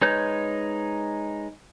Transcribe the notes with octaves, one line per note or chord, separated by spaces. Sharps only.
G#3 D#4 B4 C#5 G6